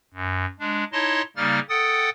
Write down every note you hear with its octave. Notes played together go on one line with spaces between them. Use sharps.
F#2
G#3 D4
D#4 E4 C#5 D#5 A5 C6
C#3 G3 A#3 D#4 F6 A6
A4 F#5 G5 D#6 A6